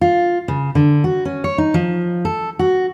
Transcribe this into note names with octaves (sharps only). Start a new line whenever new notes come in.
F4
C#3
D3
F#4
C#4
C#5
D#4
F3
A4
F#4